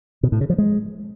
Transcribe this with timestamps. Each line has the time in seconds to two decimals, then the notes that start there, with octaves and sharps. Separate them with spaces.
0.23 B2
0.32 A2
0.41 C#3
0.50 F3
0.58 G#3